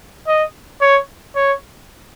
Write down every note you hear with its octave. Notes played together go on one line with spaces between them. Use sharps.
D#5
C#5
C#5